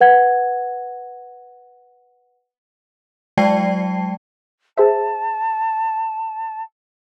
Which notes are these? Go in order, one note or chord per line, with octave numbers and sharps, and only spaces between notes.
B4 F#5 G#6
F#3 G#3 D5 G5 A5 C7
G#4 C5 E5 A5